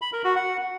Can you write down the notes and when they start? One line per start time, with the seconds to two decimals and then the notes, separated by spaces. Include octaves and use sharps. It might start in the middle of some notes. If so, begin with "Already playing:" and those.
0.02 B5
0.13 A#4
0.24 F#4
0.36 F#5